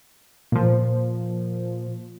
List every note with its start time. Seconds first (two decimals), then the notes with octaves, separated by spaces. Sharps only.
0.52 A#2 F3